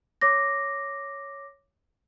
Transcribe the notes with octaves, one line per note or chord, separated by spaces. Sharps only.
C#5 D6 A#6